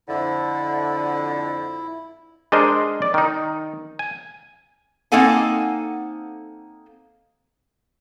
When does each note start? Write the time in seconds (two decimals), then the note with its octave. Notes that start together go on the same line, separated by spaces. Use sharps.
0.08 F2 D3 E4
2.52 G#3 D4 G#4 A#4 C5 D#5
3.02 D5
3.14 D#3 D#4
3.99 G#5
5.12 A#3 C4 D#4 A4 F#5 G#5